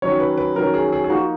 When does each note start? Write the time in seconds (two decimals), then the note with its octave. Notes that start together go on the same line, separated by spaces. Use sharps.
0.02 D#3 F#3 C#4 C#5
0.20 B4
0.38 B4
0.56 D#3 F#3 C#4 A#4
0.74 G#4
0.92 G#4
1.04 G#4
1.10 F3 A#3 D#4 F#4